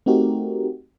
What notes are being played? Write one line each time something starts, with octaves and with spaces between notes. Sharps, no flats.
A3 C4 D#4 F#4 G4 A#4